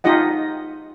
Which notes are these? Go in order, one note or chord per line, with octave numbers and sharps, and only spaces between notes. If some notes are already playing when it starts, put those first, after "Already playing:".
D#4 F4 G4 D#5 F#5